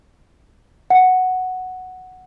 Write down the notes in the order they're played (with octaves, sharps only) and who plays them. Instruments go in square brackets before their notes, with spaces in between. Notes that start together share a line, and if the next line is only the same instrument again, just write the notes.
[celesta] F#5